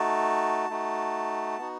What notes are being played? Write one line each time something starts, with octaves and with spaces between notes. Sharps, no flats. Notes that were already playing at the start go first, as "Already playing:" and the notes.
Already playing: A3 D#4 F#4 A5
A3 D#4 F#4
B3 D#4 F#4